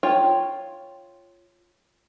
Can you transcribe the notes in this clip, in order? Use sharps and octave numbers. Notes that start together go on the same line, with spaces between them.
F4 C#5 G5